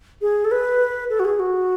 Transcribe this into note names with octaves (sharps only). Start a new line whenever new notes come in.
G#4
A4
B4
A4
F#4
G#4
F#4